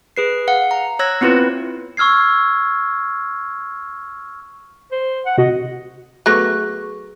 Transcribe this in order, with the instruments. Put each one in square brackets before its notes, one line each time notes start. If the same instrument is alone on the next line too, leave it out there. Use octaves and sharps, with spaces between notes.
[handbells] G#4 B4 C7
F5 F#5
A#5
C#5 E6 F#6 G#6 A#6
B3 C4 E4 F4 B4
[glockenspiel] C#6 E6 F6 G#6 C7
[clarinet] C5
F#5
[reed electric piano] C3 F#4 [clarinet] D#5
[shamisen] F#3 A3 B3 [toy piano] G#4 B4 C#6 [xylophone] F#6 A#6